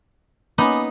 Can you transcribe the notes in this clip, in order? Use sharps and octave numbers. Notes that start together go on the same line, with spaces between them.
A#3 B3 C#4 D#4 B4 G#5 B5 D6